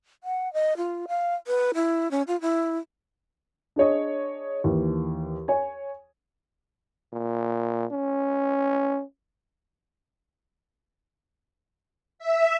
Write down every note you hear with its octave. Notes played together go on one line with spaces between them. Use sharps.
F#5
D#5
F4
F5
B4
E4
C#4
F4
E4
D4 G#4 C#5 D#5
D#2 E3
C#5 G#5
A#2
C#4
E5